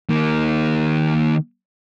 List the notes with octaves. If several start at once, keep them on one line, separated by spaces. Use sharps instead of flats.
D#3 A#3